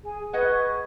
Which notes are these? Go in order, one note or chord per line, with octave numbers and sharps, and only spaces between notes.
G#4 G#5
G#4 B4 D#5 F#5 C#6 G#6